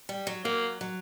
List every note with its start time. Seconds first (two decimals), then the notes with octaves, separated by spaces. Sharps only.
0.09 G3
0.27 F#3
0.44 F#3 A#3
0.81 F#3